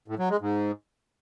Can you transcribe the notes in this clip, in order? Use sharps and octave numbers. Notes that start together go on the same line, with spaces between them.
A2
F#3
G#3
G#2